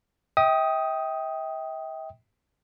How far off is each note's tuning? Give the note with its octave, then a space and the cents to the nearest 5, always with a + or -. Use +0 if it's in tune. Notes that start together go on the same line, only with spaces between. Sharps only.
E5 -45 G5 +0 D#6 +10